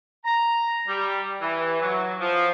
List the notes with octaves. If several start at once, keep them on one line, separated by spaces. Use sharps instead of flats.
A#5
G3
E3
F#3
F3